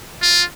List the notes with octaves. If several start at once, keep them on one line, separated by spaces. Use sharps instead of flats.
F4